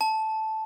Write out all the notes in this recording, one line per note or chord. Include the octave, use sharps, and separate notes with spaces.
A5